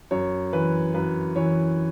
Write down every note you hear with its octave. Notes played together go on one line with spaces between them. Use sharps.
F#2 C#5
E3 B4
F#2 B4
E3 C#5